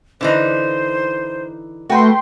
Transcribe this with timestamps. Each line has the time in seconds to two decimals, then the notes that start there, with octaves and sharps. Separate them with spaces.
0.21 D3 E3 D#4 C5
1.89 A3 F#4 B4 G5 C6